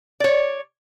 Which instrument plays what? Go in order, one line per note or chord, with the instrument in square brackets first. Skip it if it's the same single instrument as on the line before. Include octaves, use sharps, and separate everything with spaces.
[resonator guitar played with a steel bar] C#5 D5